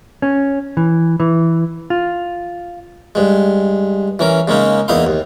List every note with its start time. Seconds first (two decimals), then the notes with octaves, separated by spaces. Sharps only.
0.22 C#4
0.77 E3
1.20 E3
1.90 F4
3.15 G2 G#3
4.19 E3 C#4 A#4
4.48 C#3 G#3 A#3 C#4 D#4
4.88 E2 A#3 D#4 E4 F5 C6
5.07 D#2